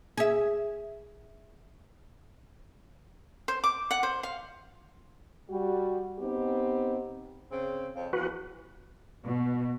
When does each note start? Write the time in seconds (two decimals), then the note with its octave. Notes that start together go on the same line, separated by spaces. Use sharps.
0.17 G#4 E5
3.48 C5
3.64 D6
3.91 F#5
4.03 C5
4.23 F5
5.49 G3 F#4
6.19 B3 C4 D#4 G4
7.50 C#3 C4
7.94 F2 C#3 C4
8.13 E2 F3 F#4 B4
9.25 B2